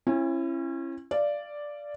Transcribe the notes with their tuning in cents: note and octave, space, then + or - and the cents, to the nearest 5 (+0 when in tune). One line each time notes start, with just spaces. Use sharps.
C#4 -35 E4 +25
D5 +0 F5 -25